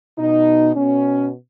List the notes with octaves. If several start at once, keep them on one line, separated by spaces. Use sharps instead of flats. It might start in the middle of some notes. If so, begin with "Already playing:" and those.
B2 D#4
B2 C#4